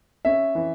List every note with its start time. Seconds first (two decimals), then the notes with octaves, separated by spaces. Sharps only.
0.25 C#4 E5
0.55 E3